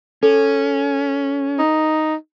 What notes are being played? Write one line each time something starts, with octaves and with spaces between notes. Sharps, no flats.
C#4 A4
D#4